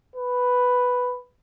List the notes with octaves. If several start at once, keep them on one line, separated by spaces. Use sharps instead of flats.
B4